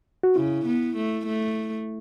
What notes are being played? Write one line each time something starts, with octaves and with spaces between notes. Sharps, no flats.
F#4
C#3 E4
B3
A3
A3